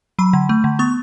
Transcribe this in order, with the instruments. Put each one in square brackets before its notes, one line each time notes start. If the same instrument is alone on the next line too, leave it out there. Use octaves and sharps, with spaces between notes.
[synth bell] F#3 B5
D3
A3
D3
B3 C#6